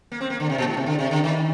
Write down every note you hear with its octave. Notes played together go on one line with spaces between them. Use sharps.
A#3
C4
A#3
D3
C3
A#2
G#2
C3
D3
C3
D3
D#3